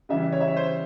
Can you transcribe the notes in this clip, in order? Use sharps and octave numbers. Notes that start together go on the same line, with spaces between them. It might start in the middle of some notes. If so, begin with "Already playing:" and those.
C#3 E3 G3 E5
C#5
E5
C#5
C5